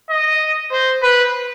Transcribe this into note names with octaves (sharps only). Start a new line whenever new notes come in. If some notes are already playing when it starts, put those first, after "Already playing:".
D#5
C5
B4